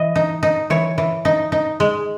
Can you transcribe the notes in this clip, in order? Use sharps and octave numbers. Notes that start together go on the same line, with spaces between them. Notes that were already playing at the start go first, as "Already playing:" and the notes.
Already playing: E3 D#5
D#4
D#4
E3 C#5
E3
D#4
D#4
G#3